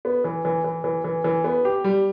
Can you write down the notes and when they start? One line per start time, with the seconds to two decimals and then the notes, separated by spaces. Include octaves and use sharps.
0.05 B3
0.24 E3
0.45 E3
0.64 E3
0.84 E3
1.04 E3
1.24 E3
1.44 B3
1.65 G4
1.84 G3